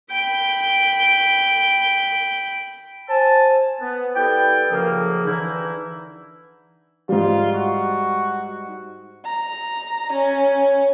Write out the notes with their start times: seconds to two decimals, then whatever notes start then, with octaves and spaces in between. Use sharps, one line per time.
0.11 G5 B5
3.09 C5 G#5 A5
3.81 B3
4.15 G3 B3 E4 A4 G5
4.71 F#2 C#3 F3 A#3
5.25 D3 E3 D#4 E4
7.09 G#2 G3 F4
7.53 F#4
9.25 A#5
10.13 C#4